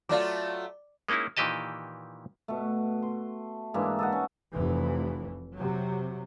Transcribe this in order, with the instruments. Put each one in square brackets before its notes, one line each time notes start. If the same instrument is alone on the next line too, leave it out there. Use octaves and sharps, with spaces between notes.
[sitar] F#3 A3 F4 [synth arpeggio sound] D5 D6
[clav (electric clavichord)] G#3 A#3 C#4 D#4 E4
A#2 D#3 E3 G4 D#5 A5
[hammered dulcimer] B2 A3
C6
G#2 E3 A#3 D4
A4 D#5 F#5
C#4
[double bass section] F1 E3
C3 F#3